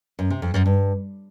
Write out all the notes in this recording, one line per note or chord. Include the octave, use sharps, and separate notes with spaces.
F#2
C3
F2
F#2
G2